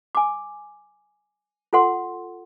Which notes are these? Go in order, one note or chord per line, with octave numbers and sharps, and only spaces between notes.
G#5 D6
F4 A4 F#5 C6